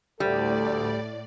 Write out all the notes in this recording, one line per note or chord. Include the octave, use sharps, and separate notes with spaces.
D2 A2 G3 A4 D5